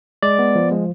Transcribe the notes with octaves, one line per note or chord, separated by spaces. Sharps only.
G#3 D5
B3
F3
G#3